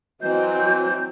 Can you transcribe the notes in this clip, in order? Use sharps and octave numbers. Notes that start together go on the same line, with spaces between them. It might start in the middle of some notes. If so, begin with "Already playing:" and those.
E3 F#3 C4 D#5 G6